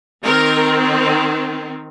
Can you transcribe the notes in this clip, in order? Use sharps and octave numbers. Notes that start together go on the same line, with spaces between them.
D#3 C4 A#4